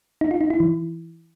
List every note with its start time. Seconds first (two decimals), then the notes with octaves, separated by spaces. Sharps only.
0.21 D#4
0.31 F4
0.41 D#4
0.50 E4
0.60 E3